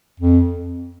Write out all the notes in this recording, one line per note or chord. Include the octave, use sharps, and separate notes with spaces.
F2